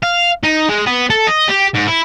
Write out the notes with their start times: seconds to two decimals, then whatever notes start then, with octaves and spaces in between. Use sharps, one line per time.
0.03 F5
0.43 D#4
0.69 G#3
0.86 B3
1.10 A4
1.28 D#5
1.49 G4
1.75 G#2
1.87 E4